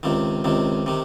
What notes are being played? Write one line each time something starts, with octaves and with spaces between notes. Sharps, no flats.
C#2 C3 D#3
C#2 C3 D#3
C3 D#3